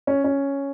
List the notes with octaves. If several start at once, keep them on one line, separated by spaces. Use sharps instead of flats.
C#4
C#4